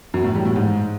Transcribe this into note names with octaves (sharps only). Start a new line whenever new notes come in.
F#2
A2
G3
A2
G#2